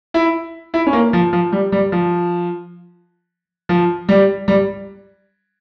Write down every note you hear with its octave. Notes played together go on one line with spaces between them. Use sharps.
E4
E4
C#4
A#3
F3
F3
G3
G3
F3
F3
G3
G3